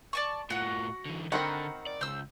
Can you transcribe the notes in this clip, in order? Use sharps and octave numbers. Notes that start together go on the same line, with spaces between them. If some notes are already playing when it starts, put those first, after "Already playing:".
D5 A5 C#6
A2 F4 F#4 F#5
D3 E3
D3 D#3 C4 A#4 F#5 B5
D5
C#2 C5 E6